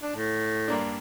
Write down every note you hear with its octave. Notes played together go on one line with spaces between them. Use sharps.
D4
A2
G2 A#3 D4